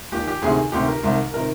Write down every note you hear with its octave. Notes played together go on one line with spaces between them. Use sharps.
D#2 D#3 G4
G4
D2 C3 D#3 G#4
D2 C3 D#3 G4
A#4
C2 C3 D#3
C3 D#3 A#4